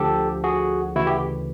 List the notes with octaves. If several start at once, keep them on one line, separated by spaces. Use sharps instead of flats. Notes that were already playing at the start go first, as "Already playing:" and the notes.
Already playing: D2 D3 F3 G4 A4
F#4 G#4
D2 C#3 E3 E4 F#4
G4